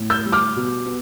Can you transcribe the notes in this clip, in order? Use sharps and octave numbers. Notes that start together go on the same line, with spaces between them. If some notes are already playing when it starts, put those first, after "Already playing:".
Already playing: A2
E6 G6
G3
D6 F6
B2
B3